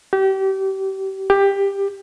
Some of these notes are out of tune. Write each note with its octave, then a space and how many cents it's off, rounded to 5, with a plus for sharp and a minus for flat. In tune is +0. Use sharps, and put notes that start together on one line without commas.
G4 -30
G4 +15